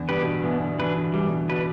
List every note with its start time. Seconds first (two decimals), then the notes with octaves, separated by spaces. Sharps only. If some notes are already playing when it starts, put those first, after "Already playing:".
Already playing: E2 D3
0.09 G2 B3 G4 B4
0.22 B2
0.26 D3
0.44 E3 B3
0.62 D3
0.79 E3 D4 B4
0.96 D3
1.14 E3 G3
1.27 B2
1.32 D3
1.49 B2 D4 B4